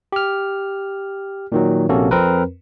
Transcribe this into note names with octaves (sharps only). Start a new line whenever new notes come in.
G4 F6
A#2 D#3 F#3
A#1 C3 A#3 C#4 F#4 A4
F2 C4 A#4 B4